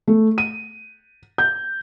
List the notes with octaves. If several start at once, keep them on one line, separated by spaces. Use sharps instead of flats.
A3
D#7
G6